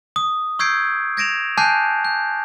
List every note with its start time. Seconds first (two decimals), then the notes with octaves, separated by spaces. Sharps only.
0.16 D#6
0.59 C#6 E6 G6 G#6 C7 D7
1.17 G#6 A#6 D7 E7 F7
1.57 G#5 A5 D6 F#6 G6 C7
2.05 G6